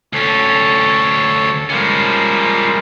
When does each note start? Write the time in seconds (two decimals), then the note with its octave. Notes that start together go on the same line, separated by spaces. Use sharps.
0.13 D2 C#4 A4 C#5
1.70 F3 G3 G#3 A#3 C#4